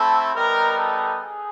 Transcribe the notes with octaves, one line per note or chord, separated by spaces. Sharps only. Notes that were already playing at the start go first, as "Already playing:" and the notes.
Already playing: A3 C4 E4 A4
G3 B3 D#4 A#4
A4
G#4